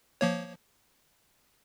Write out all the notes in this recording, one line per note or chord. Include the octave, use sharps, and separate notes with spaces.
F3 A#3 C#5